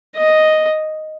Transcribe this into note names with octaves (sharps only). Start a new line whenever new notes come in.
D#5